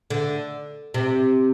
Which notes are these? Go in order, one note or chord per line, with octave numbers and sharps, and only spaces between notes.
D3
C3